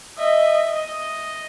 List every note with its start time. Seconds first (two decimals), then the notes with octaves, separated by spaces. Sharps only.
0.17 D#5 E5
0.73 D#5